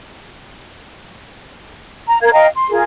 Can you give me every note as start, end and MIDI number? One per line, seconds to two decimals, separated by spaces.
2.08 2.20 82
2.21 2.33 70
2.21 2.33 77
2.21 2.33 92
2.33 2.47 75
2.33 2.47 77
2.33 2.47 79
2.33 2.47 82
2.55 2.70 84
2.70 2.82 65
2.70 2.82 68
2.70 2.82 70